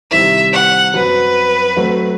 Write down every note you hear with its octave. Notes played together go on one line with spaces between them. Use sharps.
C3 D#3 G3 C4 E4 E5
F#5
F#2 F#3 C4 F#4 B4
F#3 A3 C4 F#4